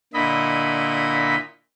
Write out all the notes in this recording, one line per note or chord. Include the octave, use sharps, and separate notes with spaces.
A#2 D3 E4 D#5 B5